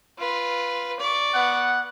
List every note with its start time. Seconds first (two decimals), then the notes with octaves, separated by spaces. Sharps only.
0.18 F4 B4
1.00 D5 C#6
1.34 B3 F#5